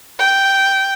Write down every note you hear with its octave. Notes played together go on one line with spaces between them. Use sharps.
G5